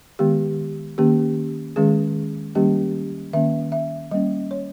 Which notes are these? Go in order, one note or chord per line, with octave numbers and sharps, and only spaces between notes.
D#3 G#3 B3 G4
D#3 A#3 C#4 G4
D#3 G#3 C#4 G#4
D#3 G3 A#3 C#4 G4
D#3 A#3 C#4 E5
E5
G3 A#3 C#4 D#5
C#5